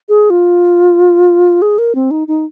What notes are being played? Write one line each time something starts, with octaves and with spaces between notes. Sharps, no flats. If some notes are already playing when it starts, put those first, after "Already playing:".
G#4
F4
G#4
A#4
C4
D#4
D#4